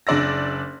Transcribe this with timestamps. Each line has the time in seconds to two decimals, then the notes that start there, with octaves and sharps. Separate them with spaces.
0.07 F#1 D4 D5 E6 A#6